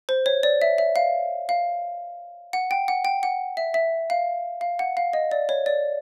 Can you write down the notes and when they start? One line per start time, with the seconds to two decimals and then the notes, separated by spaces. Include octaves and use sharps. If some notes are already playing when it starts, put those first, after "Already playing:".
0.09 C5
0.26 C#5
0.43 D5
0.62 E5
0.78 E5
0.96 F5
1.49 F5
2.53 F#5
2.71 G5
2.88 F#5
3.05 G5
3.23 F#5
3.57 E5
3.74 E5
4.10 F5
4.61 F5
4.79 F#5
4.97 F5
5.13 D#5
5.31 D5
5.49 C#5
5.66 D5